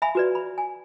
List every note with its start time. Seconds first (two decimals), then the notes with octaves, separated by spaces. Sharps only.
0.02 E5 F5 G#5 B5
0.15 F#4 B4 D5
0.35 B5
0.58 G#5